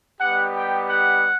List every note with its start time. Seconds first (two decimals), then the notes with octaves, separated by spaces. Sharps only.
0.21 G3 B3 D#4 G4 F#5
0.55 G5
0.89 F#5